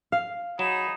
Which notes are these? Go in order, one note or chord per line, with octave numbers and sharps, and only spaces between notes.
F5
F#3 D#4 G#4 B5 E7